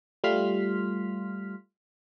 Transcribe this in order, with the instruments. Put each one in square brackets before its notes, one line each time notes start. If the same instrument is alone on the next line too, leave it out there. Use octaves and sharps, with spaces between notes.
[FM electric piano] G3 A3 F4 C6 F6 B6